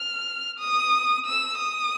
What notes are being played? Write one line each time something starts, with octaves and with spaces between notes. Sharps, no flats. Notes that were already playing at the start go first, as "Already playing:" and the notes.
Already playing: F6
D#6
E6
D#6